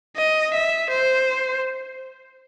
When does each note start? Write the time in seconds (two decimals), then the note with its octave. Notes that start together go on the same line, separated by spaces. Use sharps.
0.17 D#5
0.54 E5
0.90 C5